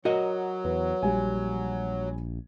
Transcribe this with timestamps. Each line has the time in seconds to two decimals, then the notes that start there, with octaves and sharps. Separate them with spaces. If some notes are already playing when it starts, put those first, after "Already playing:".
0.05 F#3 F#4 A#4 D#5
0.64 E2 B4
1.03 A#1 G3 G#5